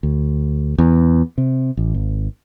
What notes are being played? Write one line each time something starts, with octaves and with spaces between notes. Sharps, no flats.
D2
E2
C3
A1
G#1